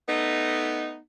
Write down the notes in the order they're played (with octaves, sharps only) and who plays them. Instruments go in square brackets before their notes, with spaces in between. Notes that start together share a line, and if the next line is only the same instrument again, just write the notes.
[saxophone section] A3 B3 D#4